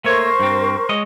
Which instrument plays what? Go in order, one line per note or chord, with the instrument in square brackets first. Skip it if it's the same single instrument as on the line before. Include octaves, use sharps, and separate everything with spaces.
[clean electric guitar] A3 A#3 C#5 [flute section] A#4 C5 C#6
[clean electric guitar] G2 C4
G#3 C#5 D#5